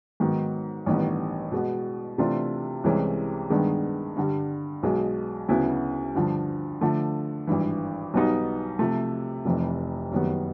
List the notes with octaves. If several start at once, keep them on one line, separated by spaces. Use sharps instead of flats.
G#2 D#3 F#3 B3
A1 G2 D#3 G3 B3
B2 G#3 B3
C3 E3 A3 D4 F4
C2 C3 E3 G#3 C#4
G2 D#3 G#3 B3 D4
G2 D3 G3
B1 B2 G#3
D2 C#3 F#3 B3 E4
G2 D3 F3
D3 F3 A3
G#1 G2 E3
B1 B2 G3 B3 D#4
C3 F3 A3
F1 F2 C3 E3
F#1 F#2 D#3 G3 B3